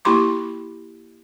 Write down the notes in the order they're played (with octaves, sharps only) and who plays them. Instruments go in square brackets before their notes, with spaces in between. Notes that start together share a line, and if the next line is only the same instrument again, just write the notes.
[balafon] A#3 E4 G4 B5 C6 D6